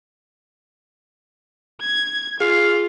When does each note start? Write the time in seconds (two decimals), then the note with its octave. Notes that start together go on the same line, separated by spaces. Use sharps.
1.81 G#6
2.41 F4 G#4 F5